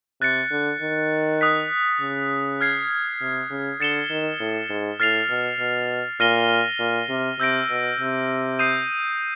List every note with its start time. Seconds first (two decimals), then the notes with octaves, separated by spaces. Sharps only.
0.21 C3 F#6 A6 C#7
0.51 D3
0.81 D#3
1.41 D#6 F#6 B6
2.00 C#3
2.61 F6 G#6 C7
3.21 C3
3.50 C#3
3.80 D3 A6 C#7 E7 G7
4.10 D#3
4.40 A2
4.70 G#2
5.00 A2 F6 A6 C7 F7
5.29 B2
5.59 B2
6.20 A#2 F6 A#6 D#7 G7
6.80 A#2
7.09 C3
7.40 C3 E6 G6 A#6 D7
7.70 B2
8.00 C3
8.59 D#6 G6 C7 D#7